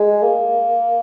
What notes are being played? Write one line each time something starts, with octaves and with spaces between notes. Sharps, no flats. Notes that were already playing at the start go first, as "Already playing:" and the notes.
Already playing: G#3
A#3